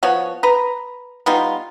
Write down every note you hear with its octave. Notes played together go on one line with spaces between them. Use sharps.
F3 B3 F#4 C#5
B4 A#5
G3 B3 D#4 F4